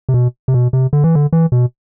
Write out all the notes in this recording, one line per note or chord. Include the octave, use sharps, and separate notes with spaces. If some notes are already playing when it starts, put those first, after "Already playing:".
C3
B2
C3
B2
C3
D3
E3
D3
E3
B2